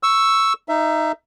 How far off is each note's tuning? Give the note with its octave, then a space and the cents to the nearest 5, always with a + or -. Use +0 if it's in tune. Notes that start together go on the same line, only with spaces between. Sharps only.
C#6 +0 E6 +0
D#4 +0 E5 +20